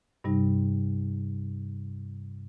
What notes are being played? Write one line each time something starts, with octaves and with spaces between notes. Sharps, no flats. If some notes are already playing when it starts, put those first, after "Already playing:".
G2 C3 G3 D#4